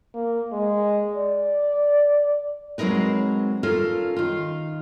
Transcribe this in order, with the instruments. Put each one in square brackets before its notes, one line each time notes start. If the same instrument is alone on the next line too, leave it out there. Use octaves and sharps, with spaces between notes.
[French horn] A#3
G#3
D5
[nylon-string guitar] F#3 G#3 C4 D#4 A#4 B4
C#4 F4 A4 A#4
D#3 F4